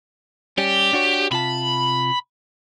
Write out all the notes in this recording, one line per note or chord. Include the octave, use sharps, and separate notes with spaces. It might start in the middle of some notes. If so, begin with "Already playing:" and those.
G3 C#4 G4
D4 F#4 C#5
C3 F4 A5 B5